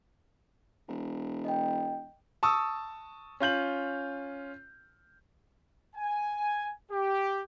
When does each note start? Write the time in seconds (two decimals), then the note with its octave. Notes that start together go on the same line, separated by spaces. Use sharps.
0.88 E1
1.45 D#5 G5
2.43 A5 C#6 D#6 E6
3.40 C#4 F4 G6 F#7
5.96 G#5
6.92 G4